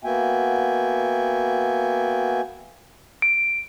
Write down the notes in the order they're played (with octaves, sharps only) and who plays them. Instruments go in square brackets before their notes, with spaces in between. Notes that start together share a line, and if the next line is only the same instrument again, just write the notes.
[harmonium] A#3 B3 F#4 E5 G5 G#5
[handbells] D7